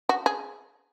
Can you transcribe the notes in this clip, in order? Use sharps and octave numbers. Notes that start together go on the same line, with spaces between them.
F#4
G#4